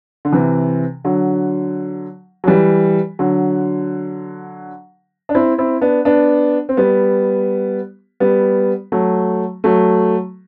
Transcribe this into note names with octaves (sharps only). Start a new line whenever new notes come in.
D3
C3 E3
D3 F#3
F#3
E3 G3
D3 F#3
D4
C4 E4
C4 E4
B3 D4
B3 D4
C4
G3 B3
G3 B3
F#3 A3
F#3 A3